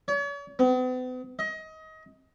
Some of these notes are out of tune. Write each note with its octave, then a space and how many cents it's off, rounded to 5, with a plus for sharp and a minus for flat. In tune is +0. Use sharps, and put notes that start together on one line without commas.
C#5 +40
B3 +45
D#5 +25